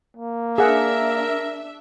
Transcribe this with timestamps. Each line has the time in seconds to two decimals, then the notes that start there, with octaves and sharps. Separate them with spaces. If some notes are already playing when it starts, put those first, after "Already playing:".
0.17 A#3
0.58 D4 G#4 A#4 E5 F#5